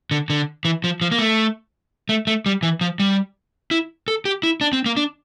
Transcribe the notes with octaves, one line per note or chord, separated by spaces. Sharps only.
D3
D3
E3
F3
F3
A#3
A3
A3
A3
G3
E3
F3
G3
E4
A4
G4
E4
D4
C4
A#3
D4